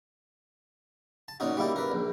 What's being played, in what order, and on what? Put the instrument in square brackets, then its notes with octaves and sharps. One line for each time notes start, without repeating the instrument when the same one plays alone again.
[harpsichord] A5
A#2 C#4 D#4 F#4
G3 A#3 E4 G4
A#4 B4
A#1